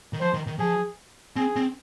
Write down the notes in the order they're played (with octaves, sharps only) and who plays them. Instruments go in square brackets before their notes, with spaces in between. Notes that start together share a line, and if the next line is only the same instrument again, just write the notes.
[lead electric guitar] D#3
[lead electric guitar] F3 [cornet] C5
[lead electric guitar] D#3
D#3
[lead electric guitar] F3 [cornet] G#4
[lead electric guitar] C4 [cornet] G#4
[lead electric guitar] C4